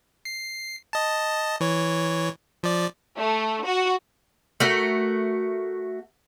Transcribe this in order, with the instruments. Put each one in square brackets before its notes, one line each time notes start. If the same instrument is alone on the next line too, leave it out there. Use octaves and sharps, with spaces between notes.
[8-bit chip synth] C7
D#5 A5
E3 C#5
F3 D5
[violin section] A3
F#4
[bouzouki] A3 F#4 A#4